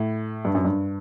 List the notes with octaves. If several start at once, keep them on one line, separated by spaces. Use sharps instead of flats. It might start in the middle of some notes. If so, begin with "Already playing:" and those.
Already playing: A2
G2
F#2
G2